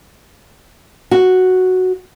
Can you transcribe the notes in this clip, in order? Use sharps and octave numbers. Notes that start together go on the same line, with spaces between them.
F#4